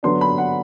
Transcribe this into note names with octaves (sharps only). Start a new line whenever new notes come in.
D3 F#3 B3 D4 C6
B5
F#5